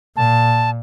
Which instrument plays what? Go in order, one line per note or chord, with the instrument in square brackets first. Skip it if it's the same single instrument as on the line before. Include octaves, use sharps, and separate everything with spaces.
[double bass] A#2 [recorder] A5